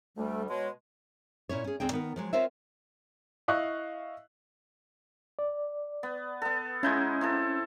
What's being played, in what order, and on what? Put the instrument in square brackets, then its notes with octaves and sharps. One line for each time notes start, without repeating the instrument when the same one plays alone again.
[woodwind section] D2 G3 [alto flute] A3
[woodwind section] B2 G#3 [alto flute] C#5
[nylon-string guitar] A#2 C#4 E4 C#5
C#4 G#4
D2 C4 G#4 G5
D#3 B3 A#4
F3 F#3 G#3
C4 F4 A#4 C5 C#5 E5
[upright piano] E4 D#5 F5 C#6 F#6
[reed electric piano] D5
[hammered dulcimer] B3
B3 A4
[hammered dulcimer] G#3 D#4 E4 [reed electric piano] C#4 G6 G#6
[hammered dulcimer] C4 E4 A4